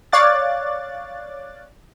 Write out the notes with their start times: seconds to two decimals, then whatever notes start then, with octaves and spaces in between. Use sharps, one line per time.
0.12 C#5 D5 F5 D6 F#6 A6